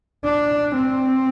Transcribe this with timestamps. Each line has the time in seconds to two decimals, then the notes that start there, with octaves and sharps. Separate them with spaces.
0.25 D4
0.76 C4